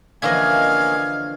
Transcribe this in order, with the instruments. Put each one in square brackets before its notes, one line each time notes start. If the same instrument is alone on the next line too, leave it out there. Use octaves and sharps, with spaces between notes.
[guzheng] D3 E3 F3 [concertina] A#3 C#4 [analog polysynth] D#5 G#6 [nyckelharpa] F5